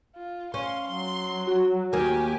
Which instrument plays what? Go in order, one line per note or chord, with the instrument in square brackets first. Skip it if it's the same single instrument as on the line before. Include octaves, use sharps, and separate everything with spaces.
[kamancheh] F4
[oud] C#4 [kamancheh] F5 C6
[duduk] F#3 [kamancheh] C6
[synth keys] F#4
[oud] D#2 A#3 [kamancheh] G4 G#5